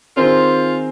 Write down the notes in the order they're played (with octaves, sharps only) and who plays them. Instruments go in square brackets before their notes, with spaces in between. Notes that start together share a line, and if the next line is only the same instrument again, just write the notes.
[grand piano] D#3 C4 G#4 C5 [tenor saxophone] F4